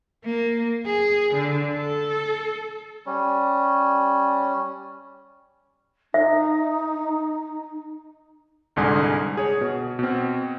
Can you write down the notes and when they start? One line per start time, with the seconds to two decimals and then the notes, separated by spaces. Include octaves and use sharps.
0.25 A#3
0.86 G#4
1.34 D3
1.74 A4
3.06 G3 C#4
6.14 D#4 E5
8.76 C2 G#2 D3 G#5 D#6
9.37 G#4 C#5
9.61 B2
9.99 B2 C4